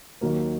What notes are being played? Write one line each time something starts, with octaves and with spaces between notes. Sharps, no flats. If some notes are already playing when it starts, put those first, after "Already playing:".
D#2 D#3 F#3 A#3